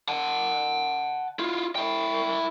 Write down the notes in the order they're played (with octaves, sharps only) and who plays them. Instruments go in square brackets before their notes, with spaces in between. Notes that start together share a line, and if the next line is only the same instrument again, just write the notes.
[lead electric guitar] F#5 A5
E4 F4
E4 G5